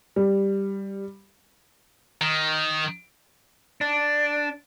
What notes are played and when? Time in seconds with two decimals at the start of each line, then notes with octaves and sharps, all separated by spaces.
0.16 G3
2.21 D#3
3.81 D4